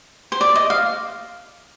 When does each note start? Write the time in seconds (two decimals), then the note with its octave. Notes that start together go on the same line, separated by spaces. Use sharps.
0.32 C5
0.41 D5
0.56 D#5
0.70 F5